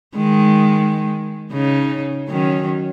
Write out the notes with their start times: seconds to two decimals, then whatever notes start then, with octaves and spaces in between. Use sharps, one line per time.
0.15 D#3 G#3
1.52 C#3 D#4
2.28 D#3 F#3 C#4